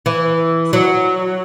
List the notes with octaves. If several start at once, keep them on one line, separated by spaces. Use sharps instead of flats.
E3
F#3